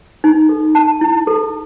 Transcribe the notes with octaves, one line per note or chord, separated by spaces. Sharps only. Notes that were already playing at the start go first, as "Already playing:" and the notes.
D#4
A4
A5
E4
A4